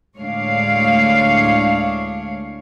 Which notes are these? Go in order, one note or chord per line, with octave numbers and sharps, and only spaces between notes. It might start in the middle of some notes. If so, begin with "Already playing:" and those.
D2 A2 G#3 D4 C#5 F5